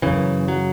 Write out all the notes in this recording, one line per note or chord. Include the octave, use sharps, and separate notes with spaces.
F#2 C#3 E3
F#3